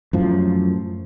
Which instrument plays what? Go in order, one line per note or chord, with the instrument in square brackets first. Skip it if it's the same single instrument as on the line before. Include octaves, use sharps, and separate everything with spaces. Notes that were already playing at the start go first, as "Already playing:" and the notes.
[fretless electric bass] F#2 A2 F3